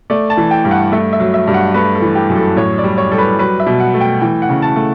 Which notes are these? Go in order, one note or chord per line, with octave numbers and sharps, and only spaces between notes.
A3 D5
A5
E3
G5
G2
F#5
A3 E5
E5
F#3
E5
G2
F#5
A3 B4
A4
E3
G4
F#2
A4
A2 C#5
D5
G3
C#5
G3 A4
B4
F#3 B4
E5
B2
F#5
A3
G5
E3 G5
F#5
C#3
A5
A3